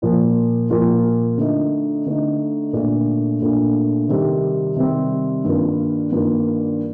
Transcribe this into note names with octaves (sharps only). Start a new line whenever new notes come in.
A#2 F3 A#3 F4
A#2 F3 A#3 F4
D3 A3 D#4
D3 A3 D#4
A#2 A3 D4
A#2 A3 D4
C3 D#3 G3 C4 G4
C3 D#3 G3 C4 G4
G2 D#3 A#3 F4
G2 D#3 A#3 F4